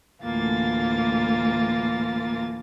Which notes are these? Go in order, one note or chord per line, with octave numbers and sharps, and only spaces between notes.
D2 A2 E3 A#3 F4 A6